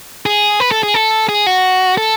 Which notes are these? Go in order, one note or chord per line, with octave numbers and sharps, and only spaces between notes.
G#4
B4
A4
G#4
A4
G#4
F#4
A4